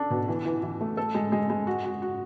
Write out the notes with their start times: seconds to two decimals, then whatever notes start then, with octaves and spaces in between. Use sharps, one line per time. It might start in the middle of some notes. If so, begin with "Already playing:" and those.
Already playing: D4 A4
0.10 B2
0.28 E3
0.46 E3
0.63 E3
0.81 A3
0.97 A4
1.14 G#3
1.32 G#3
1.50 G#3
1.67 F#4
1.85 F#4
2.02 F#4